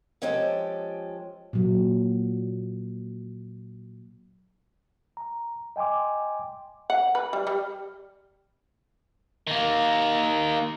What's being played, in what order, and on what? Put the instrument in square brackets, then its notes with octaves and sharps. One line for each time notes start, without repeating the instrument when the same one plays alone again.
[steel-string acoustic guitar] F3 G#3 C#4 G4 A4
[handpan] A#2 F#3
[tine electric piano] A#5
D#5 G5 G#5 C6 D6
[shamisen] F#5
B4
G3
G3
[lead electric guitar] D#3 A#3